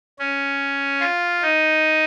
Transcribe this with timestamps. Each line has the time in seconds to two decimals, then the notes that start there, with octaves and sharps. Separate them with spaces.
0.19 C#4
1.00 F4
1.42 D#4